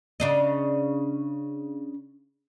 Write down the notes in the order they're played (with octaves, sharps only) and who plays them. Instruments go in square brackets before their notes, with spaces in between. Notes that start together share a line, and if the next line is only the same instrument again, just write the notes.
[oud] C#3 D4 D#4